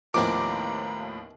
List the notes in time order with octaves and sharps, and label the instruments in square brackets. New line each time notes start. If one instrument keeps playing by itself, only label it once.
[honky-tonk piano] D#2 A2 F3 [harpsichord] D#3 B3 C#4 [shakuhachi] A#5 [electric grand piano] D6